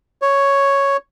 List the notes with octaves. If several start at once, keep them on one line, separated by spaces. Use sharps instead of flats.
C#5